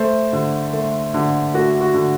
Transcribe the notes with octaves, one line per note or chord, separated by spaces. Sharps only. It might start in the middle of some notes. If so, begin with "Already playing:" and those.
Already playing: A3 C5
D3
A3
D3
A3 F#4
F#4
D3